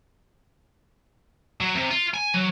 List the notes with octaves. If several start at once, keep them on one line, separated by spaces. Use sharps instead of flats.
F#3
C3
F4
G#5
F#3